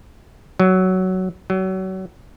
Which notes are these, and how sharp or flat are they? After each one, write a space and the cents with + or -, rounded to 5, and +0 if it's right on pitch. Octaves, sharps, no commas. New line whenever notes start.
F#3 +10
F#3 +30